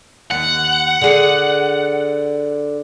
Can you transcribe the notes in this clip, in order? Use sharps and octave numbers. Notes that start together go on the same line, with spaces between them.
D#2 F#5
D3 G#4